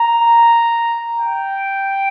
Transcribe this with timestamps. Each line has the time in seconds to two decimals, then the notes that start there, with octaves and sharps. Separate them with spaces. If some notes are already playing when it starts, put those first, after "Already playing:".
Already playing: A#5
1.20 G5